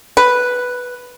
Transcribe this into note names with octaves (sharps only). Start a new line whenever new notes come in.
B4